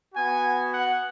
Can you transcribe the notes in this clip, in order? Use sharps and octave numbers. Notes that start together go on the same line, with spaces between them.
B3 F#4 G#5
F#5